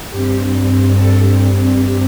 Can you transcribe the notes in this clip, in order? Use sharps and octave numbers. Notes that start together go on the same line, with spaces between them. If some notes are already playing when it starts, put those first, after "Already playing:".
G2 G3 C4 G4
A4
G4